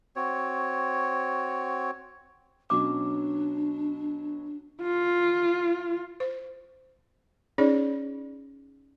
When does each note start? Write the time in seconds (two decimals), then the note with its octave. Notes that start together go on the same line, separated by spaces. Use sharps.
0.16 C4 F#4 C#5
2.70 B2 F#3 C#4 D4 D6
4.83 F4
6.20 C5
7.58 C#4 D#4 G#4 C#5 D5